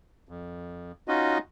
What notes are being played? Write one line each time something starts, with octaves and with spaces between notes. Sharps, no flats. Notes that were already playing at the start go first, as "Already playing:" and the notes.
F2
C#4 D#4 F4 F#4 D#5